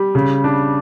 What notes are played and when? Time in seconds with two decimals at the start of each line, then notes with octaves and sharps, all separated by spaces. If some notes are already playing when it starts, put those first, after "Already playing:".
Already playing: G3
0.15 C#3
0.44 D4